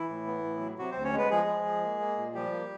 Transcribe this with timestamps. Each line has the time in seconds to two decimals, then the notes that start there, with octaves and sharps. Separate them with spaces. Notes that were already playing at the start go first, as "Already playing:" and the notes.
Already playing: E3 E4
0.09 A2
0.27 B3
0.44 A2
0.61 F#3
0.78 C3 F#3 F#4
0.91 D2 C4 C5
1.04 C#4 C#5
1.14 G#3 B3 B4
1.30 F3 G#3 G#4
1.48 F3
1.65 F3
1.83 A#3
2.00 A#3
2.17 A#2
2.35 F3 G3 G4
2.52 A#3